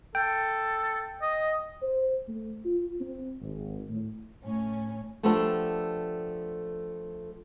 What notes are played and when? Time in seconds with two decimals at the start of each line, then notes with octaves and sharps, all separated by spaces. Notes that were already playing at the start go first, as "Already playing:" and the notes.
0.15 A4 G5
1.22 D#5
1.83 C5
2.28 A3
2.65 F4
3.01 C4
3.41 G#1
3.89 A2
4.44 A2 C#4
5.23 F3 A3 B3 D4 G4 A4